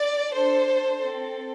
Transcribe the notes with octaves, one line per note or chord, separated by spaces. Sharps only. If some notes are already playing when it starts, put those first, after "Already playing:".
Already playing: D5
D4 A4 C5
C4 A4